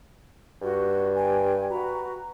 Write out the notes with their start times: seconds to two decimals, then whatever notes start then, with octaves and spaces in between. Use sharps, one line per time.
0.61 G2 F#4
1.15 G5 G#5
1.69 F#4 B4 A#5